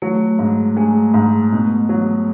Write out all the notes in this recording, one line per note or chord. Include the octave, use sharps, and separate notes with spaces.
F#3 A3
G#2
A3 G#4
G#2
B2
F#3